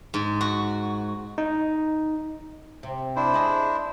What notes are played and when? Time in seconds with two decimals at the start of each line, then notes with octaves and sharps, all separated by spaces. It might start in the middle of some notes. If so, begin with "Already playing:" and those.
0.14 G#2
0.41 F#4
1.38 D#4
2.83 C3
3.16 D4 E4 C5
3.34 G#4 D#5